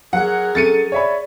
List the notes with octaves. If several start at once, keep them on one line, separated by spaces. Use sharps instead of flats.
F#3 G#4 A#4 F#5
F#3 C#4 A4 A6 C#7 D#7
C#5 D5 E5 B5